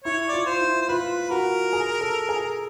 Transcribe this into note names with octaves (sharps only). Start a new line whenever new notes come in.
E4 C#5
D5
F4
C#5
C5
E4
C5
F4 B4
F#4 A#4
G#4
A4
G#4